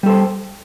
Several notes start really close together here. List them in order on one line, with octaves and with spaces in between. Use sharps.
G3 A4 C5